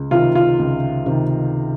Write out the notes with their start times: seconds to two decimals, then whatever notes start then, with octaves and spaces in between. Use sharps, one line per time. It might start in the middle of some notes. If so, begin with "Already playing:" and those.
Already playing: C#2
0.11 C3 D#3 F4
0.35 F4
0.59 C#2
1.06 C3 D#3